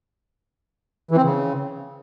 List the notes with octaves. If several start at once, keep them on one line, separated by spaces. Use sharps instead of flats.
E3
C4
C#3